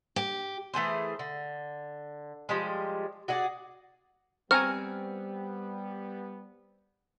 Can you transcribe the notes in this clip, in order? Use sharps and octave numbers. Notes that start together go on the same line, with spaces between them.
G4
E3 A3 G#4 C5
D3
F3 G3 G#3
F#4 G#4 D5 F#5
G3 B3 C4 G#5 A#5 C#6 F6